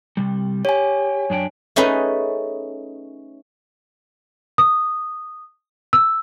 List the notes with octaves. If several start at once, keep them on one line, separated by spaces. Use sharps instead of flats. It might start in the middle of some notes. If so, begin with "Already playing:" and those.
C3 G3
G4 C#5 G#5
F#2 D4 G5
A3 C#4 D#4 G#4 B4
D#6
E6